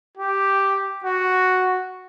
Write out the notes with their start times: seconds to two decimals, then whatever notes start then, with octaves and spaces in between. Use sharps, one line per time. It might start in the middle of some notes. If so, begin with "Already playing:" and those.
0.17 G4
1.04 F#4